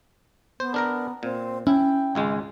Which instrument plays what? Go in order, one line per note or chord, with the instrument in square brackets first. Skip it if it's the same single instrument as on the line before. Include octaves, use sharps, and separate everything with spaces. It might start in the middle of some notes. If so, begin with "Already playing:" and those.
[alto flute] B3 [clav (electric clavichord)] C5
[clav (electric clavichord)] D4 A#4 A#5
[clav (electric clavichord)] A#2 [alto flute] C4
[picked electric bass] C#4 [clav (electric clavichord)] E4 [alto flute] G5
[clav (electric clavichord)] G#1 C#2 G#3